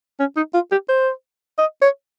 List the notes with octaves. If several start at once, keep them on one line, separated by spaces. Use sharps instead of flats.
C#4
D#4
F4
G4
C5
D#5
C#5